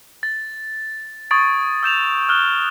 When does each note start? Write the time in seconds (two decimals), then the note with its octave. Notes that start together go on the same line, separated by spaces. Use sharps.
0.23 A6
1.31 C#6 D#6 G#6 A6 D7
1.83 E6 G6 E7 F7
2.28 D#6 F6 F#6 G7